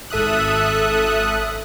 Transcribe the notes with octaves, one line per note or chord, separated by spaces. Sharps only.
G#1 A4 E5 D#6 F#6